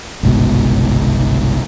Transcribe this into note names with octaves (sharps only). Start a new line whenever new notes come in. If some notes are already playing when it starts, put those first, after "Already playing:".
G1 C2 G#2 B2